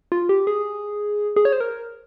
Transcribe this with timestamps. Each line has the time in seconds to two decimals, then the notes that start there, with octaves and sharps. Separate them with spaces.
0.12 F4
0.29 G4
0.47 G#4
1.36 G#4
1.45 C#5
1.53 C5
1.60 A#4